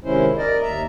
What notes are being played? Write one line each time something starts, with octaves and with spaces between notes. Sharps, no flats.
C3 D#3 G#3 C#4 E4 C5
A#4 D5 D#5
D#2 E5 A#5